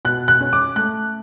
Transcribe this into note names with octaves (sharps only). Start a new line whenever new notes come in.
B2 F#6
F#6
C#4
D6
A3 F#6